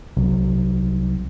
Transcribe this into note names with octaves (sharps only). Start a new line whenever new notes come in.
C2 C3 F#3